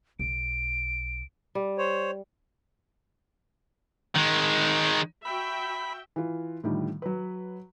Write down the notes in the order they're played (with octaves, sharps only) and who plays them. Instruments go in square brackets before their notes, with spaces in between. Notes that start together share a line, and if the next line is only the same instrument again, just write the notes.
[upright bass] B1 [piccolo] D7
[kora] G3
[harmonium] C5 C#5
[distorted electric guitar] D#3 G#3
[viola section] F#4 E5 G5 [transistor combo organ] B5
[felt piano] E3 F4
A2 D3 D#3 F3 G3
F#3 B4